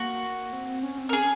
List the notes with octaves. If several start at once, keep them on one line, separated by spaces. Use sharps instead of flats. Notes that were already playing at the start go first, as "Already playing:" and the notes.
Already playing: A#3 F#4
C4
C4
C#4
C4
A#4
C#4 G#4